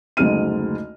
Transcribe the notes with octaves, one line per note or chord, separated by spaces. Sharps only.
F#1 D2 G#3 D#4 F6 D#7